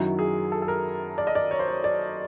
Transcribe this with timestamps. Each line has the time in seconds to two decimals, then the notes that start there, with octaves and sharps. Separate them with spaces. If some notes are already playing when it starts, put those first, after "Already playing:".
Already playing: F#2 D#3 F#3 E4
0.19 G#4
0.52 A4
0.62 A4
0.68 A#4
1.18 D5
1.27 D#5
1.35 D5
1.51 C#5
1.59 C5
1.68 C#5
1.84 D5